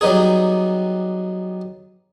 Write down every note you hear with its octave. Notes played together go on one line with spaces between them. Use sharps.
F#3 G3 B3 D#4 G#4